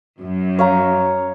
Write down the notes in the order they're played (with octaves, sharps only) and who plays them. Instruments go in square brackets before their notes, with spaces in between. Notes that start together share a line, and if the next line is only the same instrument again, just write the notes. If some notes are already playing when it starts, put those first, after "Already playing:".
[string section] F#2
[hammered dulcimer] C#5 F5 A#5